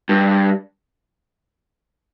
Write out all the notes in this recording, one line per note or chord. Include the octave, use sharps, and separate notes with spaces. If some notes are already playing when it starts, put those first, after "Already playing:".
G2